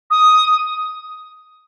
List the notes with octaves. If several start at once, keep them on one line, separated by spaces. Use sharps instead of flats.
D#6